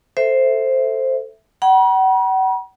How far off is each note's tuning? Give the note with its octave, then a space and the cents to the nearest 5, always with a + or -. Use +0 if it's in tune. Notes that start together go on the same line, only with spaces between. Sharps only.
A4 +10 C5 +0 E5 +0
F#5 +40 B5 -45